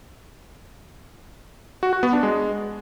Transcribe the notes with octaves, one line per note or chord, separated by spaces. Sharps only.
F#4
F#4
B3
D4
G#3